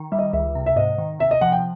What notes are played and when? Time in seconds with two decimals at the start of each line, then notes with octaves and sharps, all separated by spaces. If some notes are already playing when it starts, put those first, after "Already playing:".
Already playing: D#3
0.12 G3 E5
0.19 D#5
0.33 C#2 E5
0.55 C3
0.66 E5
0.76 G#2 D#5
0.98 D#3
1.19 C3 E5
1.31 D#5
1.41 F3 F#5
1.52 G5